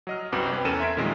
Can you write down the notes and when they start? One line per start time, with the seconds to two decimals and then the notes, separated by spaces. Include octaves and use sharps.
0.07 F#3 D#5 F6
0.32 C2 F#2 C4 F#4 B4 D6
0.53 C4 B4 G5
0.65 E2 C#4 A4 A#4 D#7 E7
0.80 E5 C6 G#6 B6 D7
0.97 A#2 D#3 F3 G3 G#3 C4